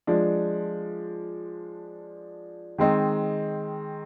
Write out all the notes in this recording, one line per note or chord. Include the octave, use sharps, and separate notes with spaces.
F3 G#3 D4
D#3 G#3 C4 D#4